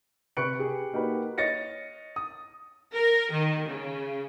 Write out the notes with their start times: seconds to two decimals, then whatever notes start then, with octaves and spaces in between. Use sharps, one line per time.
0.37 C3 B4 C#6 F#6 C#7 D7
0.59 G4 G#4
0.93 A#3 D#4 F#4 G4 A#4 B4
1.38 C#5 D#5 A6 A#6 C#7
2.16 D#6
2.93 A#4
3.31 D#3
3.68 C#3